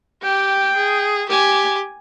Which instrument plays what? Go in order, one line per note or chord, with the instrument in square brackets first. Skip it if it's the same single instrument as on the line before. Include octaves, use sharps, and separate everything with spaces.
[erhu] G4 [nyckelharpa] G5
[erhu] G#4
[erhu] G4 [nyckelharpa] G#5